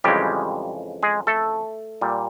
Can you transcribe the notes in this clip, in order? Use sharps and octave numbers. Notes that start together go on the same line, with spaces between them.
F2 C#3 E3 G3 G#3 G4
G#3 G#4
A3 A4
A#2 G3